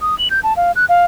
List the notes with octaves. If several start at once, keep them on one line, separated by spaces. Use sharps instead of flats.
D#6
F#7
G6
A5
F5
F#6
F5